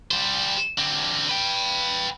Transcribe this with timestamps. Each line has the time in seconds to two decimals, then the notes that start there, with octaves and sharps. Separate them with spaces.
0.11 G3 C5
0.78 D3 C4
1.29 B4 G5